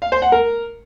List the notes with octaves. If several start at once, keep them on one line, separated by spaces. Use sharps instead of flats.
F5
C5
F#5
A#4